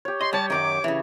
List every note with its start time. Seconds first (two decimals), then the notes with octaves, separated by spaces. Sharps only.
0.05 G4 C#5
0.21 D#5 C6
0.33 G3 G4 C#5 A5
0.50 F#2 A2 D#3 D6
0.84 C#3 E3